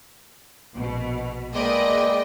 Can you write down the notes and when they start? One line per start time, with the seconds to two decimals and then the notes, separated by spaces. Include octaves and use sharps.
0.74 A#1 B2
1.54 G#3 A#3 B4 D5 D#5 G5